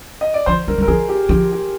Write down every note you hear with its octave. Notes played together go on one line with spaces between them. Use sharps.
D#5
D5
F3 C5
G3 A#4
G3 A#4
F3 G#4
G4
F3 G4
G4